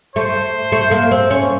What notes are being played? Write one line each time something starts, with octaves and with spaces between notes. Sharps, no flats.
A3 C5
A3
A#3
C4
C#4